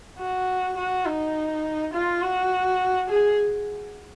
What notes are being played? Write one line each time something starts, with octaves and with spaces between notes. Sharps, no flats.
F#4
F#4
D#4
F4
F#4
G#4